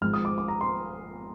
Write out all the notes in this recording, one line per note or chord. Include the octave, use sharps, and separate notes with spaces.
G#1 G#2 F3 G#3 F6
D#6
D6
D6
A#5
C6